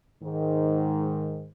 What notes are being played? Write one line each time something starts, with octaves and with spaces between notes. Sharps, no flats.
G#2 D#3